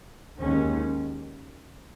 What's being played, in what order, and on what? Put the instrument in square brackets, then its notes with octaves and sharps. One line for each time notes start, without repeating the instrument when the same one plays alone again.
[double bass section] D#2 D#3 G#3 C#4